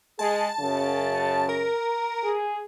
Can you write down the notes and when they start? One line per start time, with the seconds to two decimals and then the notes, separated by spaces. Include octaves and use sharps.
0.19 G#3 G#4 A5
0.60 F#2 C#3
1.49 A#4
2.24 G#4